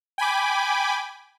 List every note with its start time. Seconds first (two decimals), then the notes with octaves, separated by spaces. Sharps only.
0.18 G5 G#5 B5 D6